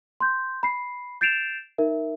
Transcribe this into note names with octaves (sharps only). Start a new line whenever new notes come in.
C6 G6
B5 C7
G6 A6 C7 D7 E7 F7
D#4 A#4 E5